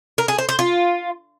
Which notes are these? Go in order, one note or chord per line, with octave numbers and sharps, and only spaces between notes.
A#4
G#4
C5
C5
F4